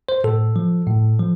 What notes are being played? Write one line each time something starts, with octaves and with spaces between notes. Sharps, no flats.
C5
A2 A4
F3
A2
F3